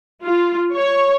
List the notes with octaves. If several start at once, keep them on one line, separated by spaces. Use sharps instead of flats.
F4
C#5